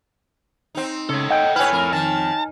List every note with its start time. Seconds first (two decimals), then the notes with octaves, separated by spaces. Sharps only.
0.75 C4 D#4
1.09 C#3 A4 C#5
1.30 D#5 F#5 G5
1.56 E4 A4 B4 C#5 G#5 F6
1.72 F2 A#4
1.93 D#3 A5